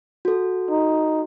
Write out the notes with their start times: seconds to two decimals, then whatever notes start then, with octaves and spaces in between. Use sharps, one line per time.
0.25 F#4 A4
0.71 D#4